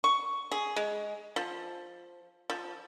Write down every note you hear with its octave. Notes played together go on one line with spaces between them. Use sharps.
C#6
G#4
G#3
F3
F3